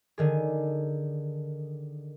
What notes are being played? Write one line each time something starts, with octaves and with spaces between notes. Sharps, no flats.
D3 D#3 G#4